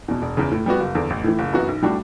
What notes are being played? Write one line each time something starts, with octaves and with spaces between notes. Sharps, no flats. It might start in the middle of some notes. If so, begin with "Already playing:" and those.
E2 B2
E1
E2 C#3
A2
G3 B3 F#4
F#1
E2 D3
A1
A2 E3
F#1
F#2 E3 B3 F#4
B1
A2 G3 D4 F#4